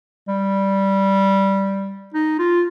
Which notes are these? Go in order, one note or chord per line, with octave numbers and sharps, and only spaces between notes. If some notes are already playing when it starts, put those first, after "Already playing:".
G3
D#4
F4